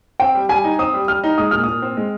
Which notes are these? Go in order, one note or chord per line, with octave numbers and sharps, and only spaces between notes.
C4 G5
G3
G3 G#5
D#4
C4 D#6
G3
G3 F6
D#4
G#3 D#6
A#2 F6
A#2 D#6
C4
G#3